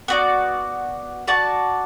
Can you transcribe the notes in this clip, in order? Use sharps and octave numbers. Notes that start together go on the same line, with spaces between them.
B3 F#4 D5
F#4 D5 A5